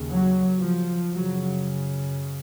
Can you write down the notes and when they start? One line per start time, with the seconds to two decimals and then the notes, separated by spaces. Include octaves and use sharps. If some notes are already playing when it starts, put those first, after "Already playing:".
Already playing: D#2 C#3
0.10 F#3
0.60 F3
1.12 F#2 C#3 F#3